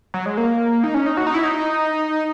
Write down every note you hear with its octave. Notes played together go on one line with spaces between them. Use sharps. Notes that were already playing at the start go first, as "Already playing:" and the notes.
F#3
G#3
A#3
D#4
C#4
D#4
F#4
D#4
E4
D#4